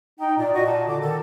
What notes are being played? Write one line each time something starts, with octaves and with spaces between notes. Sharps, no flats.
D#4 G5
A#2 D5
F#4 D#5
A#2 A5
D3 D6
D#3 A4